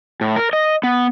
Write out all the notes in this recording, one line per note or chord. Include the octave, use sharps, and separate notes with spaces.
A2
A#4
D#5
B3